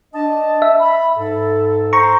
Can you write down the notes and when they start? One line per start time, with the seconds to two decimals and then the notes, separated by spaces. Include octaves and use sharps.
0.14 D4 D#5 A5
0.62 E5
0.79 B5
1.16 G#2 A4
1.93 C5 A#5 C#6